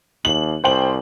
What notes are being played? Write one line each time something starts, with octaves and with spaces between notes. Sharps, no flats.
D#2 F#7
C2 C5 G5 F#7